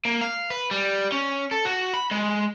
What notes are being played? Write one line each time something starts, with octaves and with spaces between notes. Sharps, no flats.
A#3
F5
B4
G3
C#4
A4
F#4
B5
G#3